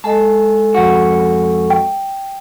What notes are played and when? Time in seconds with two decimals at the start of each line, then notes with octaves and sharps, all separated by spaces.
0.04 G#3 A4 D#5 A5
0.75 F2 F#4
1.70 G5